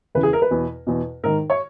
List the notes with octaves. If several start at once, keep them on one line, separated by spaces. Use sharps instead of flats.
E2 C#3 E3 B4
G#4
A#4
B4
E2 B2
E2 B2
G#2 D#3 A#4
C#5